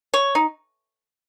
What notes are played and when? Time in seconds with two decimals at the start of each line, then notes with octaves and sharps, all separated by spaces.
0.14 C#5
0.35 D#4